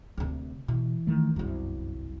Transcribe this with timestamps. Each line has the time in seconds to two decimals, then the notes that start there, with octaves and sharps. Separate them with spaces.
0.18 D2 C3
0.68 B2 E3
1.07 D#3 A3
1.36 G1 C2 F#2